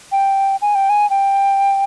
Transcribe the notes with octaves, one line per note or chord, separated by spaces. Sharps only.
G5
G#5
G5
G#5
G5